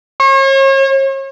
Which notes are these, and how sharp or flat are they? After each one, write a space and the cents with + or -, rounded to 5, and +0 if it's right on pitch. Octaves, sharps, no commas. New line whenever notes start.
C#5 -40